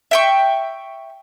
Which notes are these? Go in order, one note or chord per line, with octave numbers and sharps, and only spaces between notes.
E5 G5 C#6